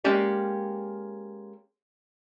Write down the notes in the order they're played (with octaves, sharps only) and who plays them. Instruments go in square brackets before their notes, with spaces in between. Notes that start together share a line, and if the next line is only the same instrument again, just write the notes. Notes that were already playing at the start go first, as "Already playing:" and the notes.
[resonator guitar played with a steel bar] G#3 A#3 C#4 G4 D5